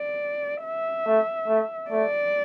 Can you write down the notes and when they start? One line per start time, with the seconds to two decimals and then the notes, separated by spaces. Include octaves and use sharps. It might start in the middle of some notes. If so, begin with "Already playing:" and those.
Already playing: D5
0.63 E5
1.06 A3
1.48 A3
1.91 A3 D5